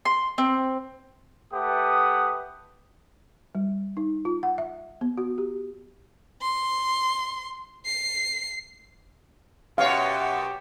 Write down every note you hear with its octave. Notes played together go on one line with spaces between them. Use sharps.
C6
C4
A3 G4 B4 F#5 D#6
G3
D#4
F4
F#5
E5
B3
F#4
G4
C6
C7
F#2 B2 G4 C#5 F5 F#5 C#6